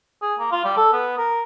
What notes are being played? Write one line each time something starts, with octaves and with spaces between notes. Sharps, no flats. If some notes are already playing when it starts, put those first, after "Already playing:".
G#4
A#3
F4
G3
A4
B3
A#4